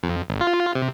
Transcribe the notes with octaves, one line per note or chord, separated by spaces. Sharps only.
F2
G#1
F4
C3